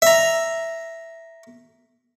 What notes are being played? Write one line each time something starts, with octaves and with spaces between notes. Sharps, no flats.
E5 A#5